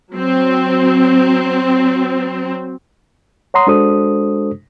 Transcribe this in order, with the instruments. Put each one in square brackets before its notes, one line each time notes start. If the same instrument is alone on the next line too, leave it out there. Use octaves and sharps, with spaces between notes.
[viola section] F#3 C4
[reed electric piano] C#5 F#5 A#5 C6 D#6
G#3 D4 F#4 A4 C5 D#6